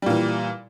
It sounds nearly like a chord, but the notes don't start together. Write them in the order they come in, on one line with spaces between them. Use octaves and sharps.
G3 A#2 E3